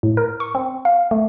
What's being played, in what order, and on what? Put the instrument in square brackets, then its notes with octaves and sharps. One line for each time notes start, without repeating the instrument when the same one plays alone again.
[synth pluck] A2
A#4
C#6
C4
F5
A3